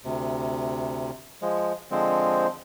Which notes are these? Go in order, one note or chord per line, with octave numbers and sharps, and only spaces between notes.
D2 C3
F3 G#3
D3 F3 G#3 C4